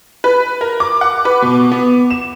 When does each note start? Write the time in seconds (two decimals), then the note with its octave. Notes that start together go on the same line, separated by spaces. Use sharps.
0.24 B4
0.61 A#4
0.80 D6
1.01 F#5
1.25 B4
1.42 B2
1.72 B3
2.10 E7